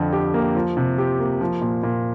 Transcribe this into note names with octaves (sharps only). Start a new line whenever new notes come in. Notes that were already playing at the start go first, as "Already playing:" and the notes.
Already playing: F2 D3
G4
A#3
F3
C3
G4
A#3
F3
A#2
A#2